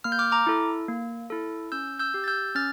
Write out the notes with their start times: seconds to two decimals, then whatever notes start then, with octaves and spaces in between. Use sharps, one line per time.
0.04 A#3 F6
0.12 G6
0.19 D6 F6
0.32 A#5 D6
0.47 E4 A4
0.88 A#3
1.30 E4 A4
1.72 C#4 E6 G6
1.99 E6 G6
2.14 G4
2.24 A6
2.28 E6 G6
2.55 C#4 F6 A6